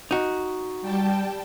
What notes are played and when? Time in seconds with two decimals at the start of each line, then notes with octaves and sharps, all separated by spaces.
0.11 D#4 F#4
0.82 G3 G5 A5